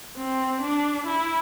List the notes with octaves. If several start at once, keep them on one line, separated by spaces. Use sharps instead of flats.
C4
D4
E4